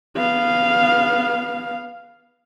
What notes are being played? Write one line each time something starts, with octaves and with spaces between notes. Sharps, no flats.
B3 F5